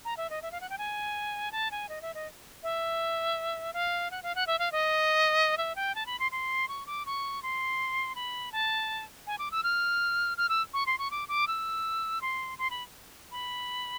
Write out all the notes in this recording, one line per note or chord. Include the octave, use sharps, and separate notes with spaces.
A#5
E5
D#5
E5
F5
F#5
G5
G#5
A5
G#5
D#5
E5
D#5
E5
F5
F#5
F5
F#5
E5
F5
D#5
E5
G5
A5
B5
C6
C6
C#6
D6
C#6
C6
B5
A5
G#5
D6
E6
F6
F6
E6
C#6
C6
C#6
D6
D6
E6
C6
C6
B5
B5